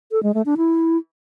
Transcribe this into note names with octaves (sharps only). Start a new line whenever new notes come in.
A4
G#3
A3
D4
E4